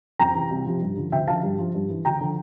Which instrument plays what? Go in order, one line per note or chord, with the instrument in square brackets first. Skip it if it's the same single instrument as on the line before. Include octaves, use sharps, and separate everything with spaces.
[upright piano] F2 G5 A#5
C3 E3
C2
C3 F3
G2
D3 F3
D2 E5 G5
D3 F3 F5 A5
G2
F3
G2
E3
D2 G5 A#5
D3 F3